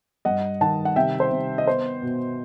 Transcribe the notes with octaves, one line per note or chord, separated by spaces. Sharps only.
G2 D#5 F#5
D#3 F#5 A5
F#5
C3 E5 G5
C5
C3
D#5
B3 C5
B2